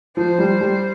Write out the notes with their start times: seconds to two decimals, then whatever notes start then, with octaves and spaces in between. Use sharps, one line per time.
0.17 F3 C5
0.39 G3
0.61 G3